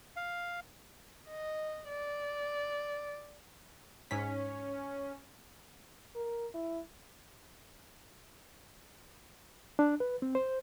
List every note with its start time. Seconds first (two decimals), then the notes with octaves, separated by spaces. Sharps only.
0.16 F5
1.28 D#5
1.88 D5
4.11 G#2 C#4 B6
6.16 A#4
6.55 E4
9.79 D4
10.00 B4
10.22 C4
10.35 C5